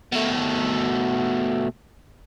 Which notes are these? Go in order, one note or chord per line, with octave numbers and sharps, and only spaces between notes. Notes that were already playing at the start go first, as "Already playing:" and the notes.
B2 A3